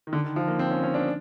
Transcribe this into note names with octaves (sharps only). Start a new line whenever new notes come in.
D#3
D3
D#3
F3
A#3
C4
C#4
C#4
D4